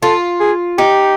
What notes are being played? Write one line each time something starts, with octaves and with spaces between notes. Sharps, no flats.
F4 A4
G#4
D#4 G4